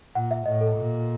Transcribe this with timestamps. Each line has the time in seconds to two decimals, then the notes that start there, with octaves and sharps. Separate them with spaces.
0.15 A#2 F#5
0.31 E5
0.46 A2 D#5
0.61 A4
0.77 A#2